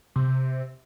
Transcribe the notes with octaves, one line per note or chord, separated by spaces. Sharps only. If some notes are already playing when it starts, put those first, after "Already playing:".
C3